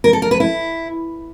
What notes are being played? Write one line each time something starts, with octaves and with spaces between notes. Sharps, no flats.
A#4
A4
A#4
B4
E4